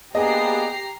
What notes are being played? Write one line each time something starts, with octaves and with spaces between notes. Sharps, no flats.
A#3 B3 D4 G4 G#4 D#5 A#5 C7